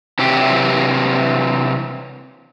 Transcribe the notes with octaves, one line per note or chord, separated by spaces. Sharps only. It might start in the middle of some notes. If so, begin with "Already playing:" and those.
C3 E3 F#3 G4